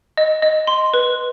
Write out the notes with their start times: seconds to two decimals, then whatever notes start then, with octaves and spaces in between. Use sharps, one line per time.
0.17 D#5
0.42 D#5
0.67 C6
0.94 B4